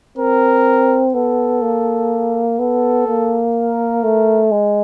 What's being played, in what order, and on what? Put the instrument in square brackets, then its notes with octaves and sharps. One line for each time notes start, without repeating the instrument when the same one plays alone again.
[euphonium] C4 [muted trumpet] A#4
[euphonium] B3 [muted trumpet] A4
[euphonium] A#3
[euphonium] B3 [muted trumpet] A4
[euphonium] A#3
[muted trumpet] A#4
[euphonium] A3
G#3